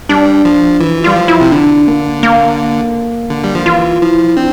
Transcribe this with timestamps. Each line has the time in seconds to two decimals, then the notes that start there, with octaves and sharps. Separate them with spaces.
0.09 G3 D4
0.45 F3
0.80 E3 F4
1.04 G3 F4
1.16 F3
1.28 E4
1.41 C3
1.51 D3 D4
1.88 A#3
2.23 A#3
3.30 D3
3.44 G3
3.55 F3
3.66 E3 F4
4.02 F3 E4
4.37 C4 D4